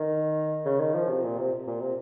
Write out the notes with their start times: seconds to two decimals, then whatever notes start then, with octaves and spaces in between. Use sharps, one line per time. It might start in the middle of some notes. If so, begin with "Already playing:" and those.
Already playing: D#3
0.65 C#3
0.80 D#3
0.94 F3
1.09 C3
1.23 A#2
1.38 C3
1.67 A#2
1.80 C3